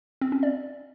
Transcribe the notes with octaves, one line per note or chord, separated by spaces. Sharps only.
C4
C#4
D5